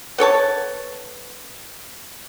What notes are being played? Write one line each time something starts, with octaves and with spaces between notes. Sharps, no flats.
B3 A4 C#5 A5